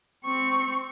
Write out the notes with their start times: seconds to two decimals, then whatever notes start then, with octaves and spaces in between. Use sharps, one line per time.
0.24 C4 C#6